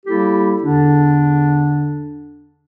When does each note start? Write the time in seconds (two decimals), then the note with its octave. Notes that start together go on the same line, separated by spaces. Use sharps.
0.06 G3 A#3 E4 G4 A4
0.63 E2 D3 D4